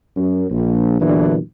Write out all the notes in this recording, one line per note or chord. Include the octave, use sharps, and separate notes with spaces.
F#2
A#1
E2 A#2 D3 E3 F#3 D4